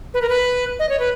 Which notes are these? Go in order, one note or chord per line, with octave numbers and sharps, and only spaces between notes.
B4
A#4
B4
D#5
C#5
B4